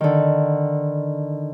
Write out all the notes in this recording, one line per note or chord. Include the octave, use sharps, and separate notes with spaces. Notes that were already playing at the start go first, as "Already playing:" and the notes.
D3 D#3